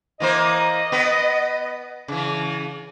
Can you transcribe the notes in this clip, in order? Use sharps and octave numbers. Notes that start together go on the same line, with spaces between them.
E3 A#3 C5 D#5
B3 B4
C#3 E3